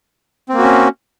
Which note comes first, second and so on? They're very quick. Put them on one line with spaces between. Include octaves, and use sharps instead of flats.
C4 A#3 F#4 C#4